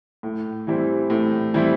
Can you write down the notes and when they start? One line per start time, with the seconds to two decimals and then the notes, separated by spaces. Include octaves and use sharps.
0.23 A2
0.67 E3 G3 C4 E4
1.10 A2
1.54 E3 G3 C4 E4